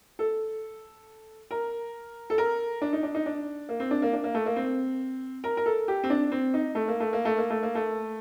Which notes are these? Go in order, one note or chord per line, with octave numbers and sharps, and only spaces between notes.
A4
A#4
A4
A#4
D4
D#4
D4
D#4
D4
A#3
C4
D4
A#3
D4
A#3
A3
A#3
C4
A#4
A#4
A4
G4
C4
D4
C4
D#4
A3
A#3
A3
A#3
A3
A#3
A3
A#3
A3